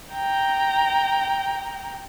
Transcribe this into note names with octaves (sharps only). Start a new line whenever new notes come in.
G5 A#5